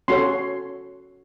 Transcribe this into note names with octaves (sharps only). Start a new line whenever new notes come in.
C#4 F#4 A4 C#5 C6